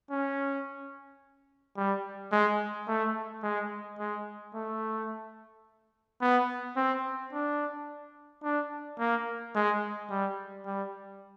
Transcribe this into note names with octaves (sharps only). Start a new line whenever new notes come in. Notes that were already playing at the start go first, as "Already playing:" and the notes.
C#4
G3
G#3
A3
G#3
G#3
A3
B3
C4
D4
D4
A#3
G#3
G3
G3